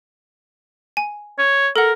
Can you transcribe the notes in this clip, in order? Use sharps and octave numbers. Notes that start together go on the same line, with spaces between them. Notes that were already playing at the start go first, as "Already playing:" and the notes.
G#5
C#5
A4 A#4 F#5